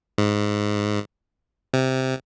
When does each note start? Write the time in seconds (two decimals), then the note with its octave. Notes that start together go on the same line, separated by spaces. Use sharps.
0.18 G#2
1.74 C3